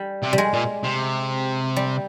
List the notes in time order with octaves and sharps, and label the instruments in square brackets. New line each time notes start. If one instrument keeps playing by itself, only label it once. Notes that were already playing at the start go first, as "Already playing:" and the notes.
Already playing: [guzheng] G3
[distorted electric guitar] C3
[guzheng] G3
G#3
[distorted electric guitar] A#2
C3
[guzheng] G3